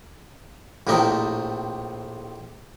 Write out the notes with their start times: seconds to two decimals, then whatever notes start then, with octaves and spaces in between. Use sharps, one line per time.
0.87 A#1 A2 C3 C4 A#4 D#5